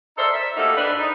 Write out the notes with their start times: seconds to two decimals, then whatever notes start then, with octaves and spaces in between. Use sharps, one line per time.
0.18 D#4 A4 A#4 C5 D5 E5
0.33 E5
0.57 A3 A#3 D#4 F#4 G4 A4
0.76 G#2 D4 B4
0.98 D#4